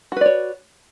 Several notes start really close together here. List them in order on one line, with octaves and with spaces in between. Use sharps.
F#4 B4 D5 C#5